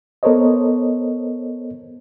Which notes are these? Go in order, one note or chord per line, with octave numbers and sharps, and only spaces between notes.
B3 A4 A#4 C5 C#5 D#5